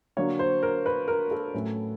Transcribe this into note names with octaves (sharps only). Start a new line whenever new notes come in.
D3 F#3 A#3 D4 C#5
C5
A#4
B4
A#4
A4
A2 F#3 A3 C#4